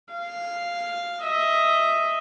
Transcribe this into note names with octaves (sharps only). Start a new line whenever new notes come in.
F5
D#5 E5